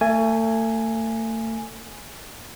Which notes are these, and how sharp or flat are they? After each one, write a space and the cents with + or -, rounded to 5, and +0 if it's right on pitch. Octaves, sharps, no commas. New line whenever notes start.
A3 +35 G#5 +0